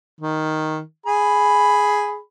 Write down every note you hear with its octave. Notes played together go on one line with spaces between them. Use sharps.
D#3
G#4 B5